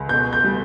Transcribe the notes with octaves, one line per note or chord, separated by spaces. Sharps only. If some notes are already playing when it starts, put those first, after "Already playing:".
Already playing: C#2
B2 G6
G6
G3